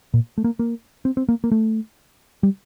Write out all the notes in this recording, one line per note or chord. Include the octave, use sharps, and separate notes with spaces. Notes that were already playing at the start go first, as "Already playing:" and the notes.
A#2
A3
A#3
A#3
C4
C4
A#3
A#3
A3
G3